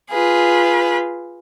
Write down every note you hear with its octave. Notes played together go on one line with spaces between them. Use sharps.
F4 G#4 B4